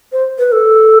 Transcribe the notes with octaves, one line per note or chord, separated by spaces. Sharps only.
C5
B4
A4